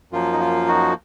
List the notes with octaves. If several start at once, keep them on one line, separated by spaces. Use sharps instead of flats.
F#2 F3 A#3 F4
D#4
F4
D#4 F#4